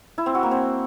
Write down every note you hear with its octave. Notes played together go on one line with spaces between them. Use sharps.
E4
C4
F#4
A#3
C4